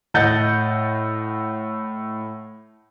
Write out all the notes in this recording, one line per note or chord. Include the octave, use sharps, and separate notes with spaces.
A2 D#5 F#5 G6 A6